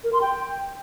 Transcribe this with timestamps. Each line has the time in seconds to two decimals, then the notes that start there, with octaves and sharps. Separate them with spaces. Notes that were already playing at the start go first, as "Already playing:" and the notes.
0.04 A#4
0.13 C6
0.22 G5